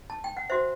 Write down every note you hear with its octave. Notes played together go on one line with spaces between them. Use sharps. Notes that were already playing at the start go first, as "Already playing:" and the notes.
A5
G5
F#5
F#4 C5 E5